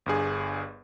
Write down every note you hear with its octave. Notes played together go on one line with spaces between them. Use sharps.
G1 G2 G#4